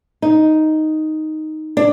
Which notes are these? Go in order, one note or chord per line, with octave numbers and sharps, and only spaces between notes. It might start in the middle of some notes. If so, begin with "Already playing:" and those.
D#4
D4